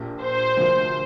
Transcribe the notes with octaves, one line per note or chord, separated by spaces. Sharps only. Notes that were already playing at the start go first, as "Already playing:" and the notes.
Already playing: A#1 A#2 A#3 G4
C5
D2 C3 F3 A#3